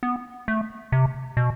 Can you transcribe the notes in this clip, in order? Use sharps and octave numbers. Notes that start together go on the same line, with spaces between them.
B3
A3
C3
B2